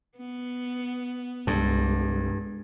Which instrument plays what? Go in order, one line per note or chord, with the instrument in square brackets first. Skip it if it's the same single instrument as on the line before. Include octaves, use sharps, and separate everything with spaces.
[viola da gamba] B3
[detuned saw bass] C2 [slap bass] G2 [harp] G#3 D4 A4